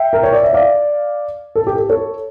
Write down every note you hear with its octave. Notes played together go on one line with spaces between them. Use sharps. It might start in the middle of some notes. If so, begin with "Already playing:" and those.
Already playing: E5 G5
A#4
C#5
D5
E5
D5 F5
A4
G4
A4
A4 C#5